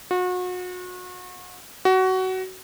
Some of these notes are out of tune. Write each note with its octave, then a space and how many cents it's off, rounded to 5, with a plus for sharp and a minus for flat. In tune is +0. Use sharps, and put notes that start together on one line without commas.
F#4 -35
F#4 +20